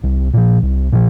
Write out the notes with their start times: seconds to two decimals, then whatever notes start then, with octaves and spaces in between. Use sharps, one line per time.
0.04 C2
0.34 A#2 F3
0.63 C2
0.92 A#2 F3